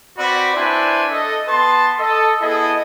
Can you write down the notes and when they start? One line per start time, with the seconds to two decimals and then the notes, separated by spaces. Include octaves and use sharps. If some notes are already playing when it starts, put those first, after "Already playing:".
0.18 C4 F#4 B4 D5 B5
0.55 D4 E4 B4 C5 E5 G#5
1.11 A4 D#5
1.48 B3 B4 A5 C6
2.00 A4 D#5
2.42 B3 E4 G#4 A4 D#5